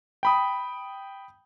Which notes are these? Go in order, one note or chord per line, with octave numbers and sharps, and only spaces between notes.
G5 B5 D#6